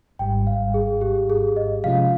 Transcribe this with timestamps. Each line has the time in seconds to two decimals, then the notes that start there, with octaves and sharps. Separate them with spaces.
0.19 G#1 G#2 G3 G5
0.47 F5
0.74 G#4
1.01 G4
1.30 G#4
1.56 D#5
1.84 C3 F3 G#3 C#4 F4 F5